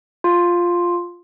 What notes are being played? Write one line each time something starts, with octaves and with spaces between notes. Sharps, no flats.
F4